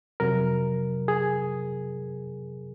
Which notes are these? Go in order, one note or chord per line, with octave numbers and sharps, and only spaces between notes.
F2 C3 F#3 A#4
G#4